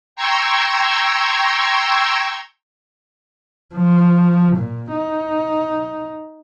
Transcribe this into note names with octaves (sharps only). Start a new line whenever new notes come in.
G5 A#5 C6 C#6 E6 G#6
F3
A#2
D#4